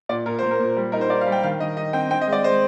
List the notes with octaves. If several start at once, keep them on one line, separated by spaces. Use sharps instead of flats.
A#2 D5
A#2 A#4
A#3 C5
A#4
A#2
G3
D#4 A#4
C5
D#4 D5
F5
G3
G5
D#3 F5
D#3 D#5
D#4 D#5
C4 G5
C4 G5
D#5
G#3 D5
G#3 C5